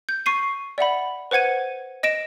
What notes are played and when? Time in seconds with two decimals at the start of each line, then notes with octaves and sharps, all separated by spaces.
0.09 G6
0.26 C#6 C7 D#7
0.78 D5 E5 F#5 B5
1.31 B4 C5 F#5 G#6 D#7
2.03 D#5 A#6 D7 E7